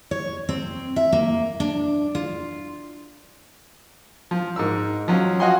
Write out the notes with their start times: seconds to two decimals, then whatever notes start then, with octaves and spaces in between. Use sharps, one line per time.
0.11 C#5
0.49 C4
0.96 E5
1.13 A#3
1.60 D4
2.15 F4
4.31 F3
4.56 G#2 A#4 E6
5.08 F3 F#3 C#4
5.40 F4 F#4 D#5 F#5 G#5 C6